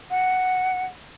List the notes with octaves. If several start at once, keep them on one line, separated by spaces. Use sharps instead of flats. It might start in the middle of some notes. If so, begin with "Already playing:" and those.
F#5